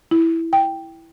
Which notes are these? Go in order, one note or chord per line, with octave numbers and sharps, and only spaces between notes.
E4
G5